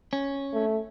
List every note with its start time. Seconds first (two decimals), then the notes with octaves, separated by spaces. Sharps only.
0.13 C#4
0.54 A3